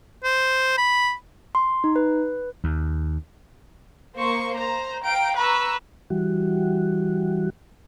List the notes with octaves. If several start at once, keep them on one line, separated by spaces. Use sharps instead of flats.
C5
B5
C6
D#4
B4
D#2
A#3 C5 C#6
C5 A#5
F5 G5 A#5 D7
B4 A#5 C#6 E6
E3 G3 F#4